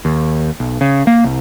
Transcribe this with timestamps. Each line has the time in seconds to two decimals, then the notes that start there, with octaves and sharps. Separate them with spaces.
0.05 D#2
0.60 B1
0.81 C#3
1.07 A#3
1.24 C2